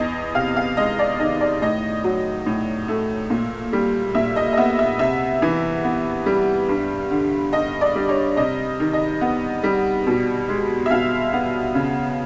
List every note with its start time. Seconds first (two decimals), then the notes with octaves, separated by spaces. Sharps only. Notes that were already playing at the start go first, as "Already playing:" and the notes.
Already playing: E2 D#5
0.35 C3 F5
0.56 F5
0.77 G#3 D#5
0.99 D5
1.20 D#3 D#5
1.41 D5
1.62 A2 D#5
2.04 F#3
2.46 A2
2.88 A3
3.30 A#2
3.73 G3
4.15 A#2 E5
4.36 D#5
4.53 D#5
4.57 B3 E5
4.79 E5
4.99 C3 E5
5.42 E3
5.84 B3
6.26 G3
6.69 G2
7.11 D3
7.53 G2 D#5
7.81 D5
7.95 G3
8.09 C#5
8.37 C3 D#5
8.80 D#3
8.93 D#5
9.21 B3
9.64 G3
10.07 B2
10.49 G#3
10.86 E5
10.90 B2 F5
11.33 B3
11.75 C#3